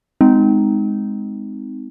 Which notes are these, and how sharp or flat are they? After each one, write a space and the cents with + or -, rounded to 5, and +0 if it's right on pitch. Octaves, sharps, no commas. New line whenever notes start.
G#3 +0 C4 -30 D#4 +0